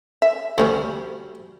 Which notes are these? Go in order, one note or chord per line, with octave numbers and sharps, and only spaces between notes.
E5
D2 C3 F#3 G3 C#4